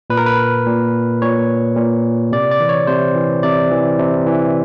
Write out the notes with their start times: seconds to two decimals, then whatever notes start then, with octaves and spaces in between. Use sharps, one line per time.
0.10 A#2 B4
0.17 A#4
0.26 B4
0.66 A#2
1.22 A#2 C#5
1.77 A#2
2.32 C3 D5
2.52 D5
2.60 E3
2.69 C#5
2.87 C3 C5
3.15 E3
3.43 C3 D5
3.71 E3
3.99 C3
4.26 E3